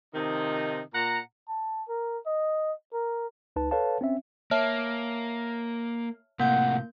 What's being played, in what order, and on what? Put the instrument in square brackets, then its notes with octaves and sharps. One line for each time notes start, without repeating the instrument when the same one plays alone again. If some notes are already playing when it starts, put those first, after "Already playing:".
[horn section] C3 D#3 F3 D#4
A#2 F#5 A#5
[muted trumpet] A5
A#4
D#5
A#4
[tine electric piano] C#2 D#4 B4 A5
A4 B4 C#5 F5 A5
C4 C#4 E5
[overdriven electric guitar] A#3 [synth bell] C#5 E5 A5 [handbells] F6
[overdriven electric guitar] A2 C3 [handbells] A#3 G6 [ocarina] F#5